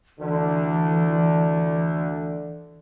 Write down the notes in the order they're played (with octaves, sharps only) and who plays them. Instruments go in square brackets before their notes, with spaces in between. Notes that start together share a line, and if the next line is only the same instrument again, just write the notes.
[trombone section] D2 D3 [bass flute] E3